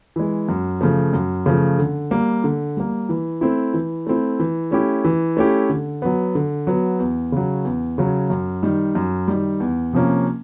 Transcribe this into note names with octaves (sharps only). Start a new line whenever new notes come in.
E3 G#3
F#2
C#3 F3 A3
F#2
C#3 F3 A3
D3
G3 A#3
D3
G3 A#3
E3
A3 C4 E4
E3
A3 C4 E4
E3
A3 C#4 E4 G4
E3
A3 C#4 E4 G4
D3
F#3 B3
D3
F#3 B3
E2
C#3 F#3
E2
C#3 F#3
F#2
D#3 G3
F#2
D#3 G3
E2
C3 F3 A#3 C#4